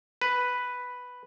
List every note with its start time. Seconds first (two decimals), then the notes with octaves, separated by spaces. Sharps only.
0.22 B4